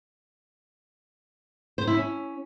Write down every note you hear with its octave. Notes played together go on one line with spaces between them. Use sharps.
C5
E4
C#4